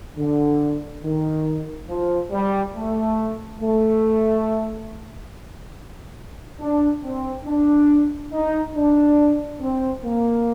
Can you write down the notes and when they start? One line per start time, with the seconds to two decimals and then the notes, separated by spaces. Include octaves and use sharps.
0.17 D3
1.03 D#3
1.89 F3
2.32 G3
2.74 A3
3.61 A3
6.60 D4
7.03 C4
7.45 D4
8.32 D#4
8.75 D4
9.60 C4
10.04 A#3